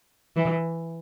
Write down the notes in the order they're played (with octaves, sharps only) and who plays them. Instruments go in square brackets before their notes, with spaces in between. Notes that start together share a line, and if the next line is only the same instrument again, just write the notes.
[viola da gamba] E3